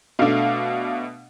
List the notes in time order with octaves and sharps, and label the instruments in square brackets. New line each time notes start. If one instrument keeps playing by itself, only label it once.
[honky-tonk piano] B2 A3 D4 F5